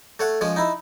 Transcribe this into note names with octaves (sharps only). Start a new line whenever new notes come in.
A3 C#5 F#5
F3 G#3 C#4
D#4 E4